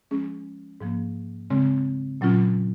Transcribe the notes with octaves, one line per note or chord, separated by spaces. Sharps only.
F3 G#3 C#4 G#4
G#2 F3 A#3
C#3 G#3 C4
A#2 F#3 C#4 F4